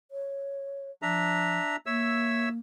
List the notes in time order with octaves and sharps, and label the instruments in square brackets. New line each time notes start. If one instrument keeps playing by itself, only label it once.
[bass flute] C#5
[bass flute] F3 [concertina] D4 E5 A#5
[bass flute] A#3 [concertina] C#5 E5 E6